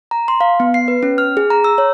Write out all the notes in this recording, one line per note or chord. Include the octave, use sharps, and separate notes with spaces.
A#5
C6
F5
B3
C7
B4
C#4
F6
G#4
A#5
E6
C#5